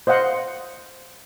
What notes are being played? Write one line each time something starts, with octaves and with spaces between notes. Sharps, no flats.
C5 D#5 F5 F#5 C6